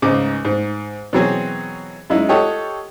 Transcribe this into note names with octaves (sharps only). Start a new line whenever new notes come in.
C#2 G#2 D#4 D#5 D6
G#2
B2 E3 F#3 C4 G#4
F#2 G#3 D#4 E4
F4 G4 A4 C#5 D#5 F#5